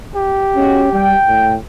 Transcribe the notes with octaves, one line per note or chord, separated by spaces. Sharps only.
G4
B2 G#3 C#4 F#4
G3 G5
A2